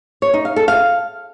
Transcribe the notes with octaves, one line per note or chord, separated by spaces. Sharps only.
C#5
D#4
F5
A4
F5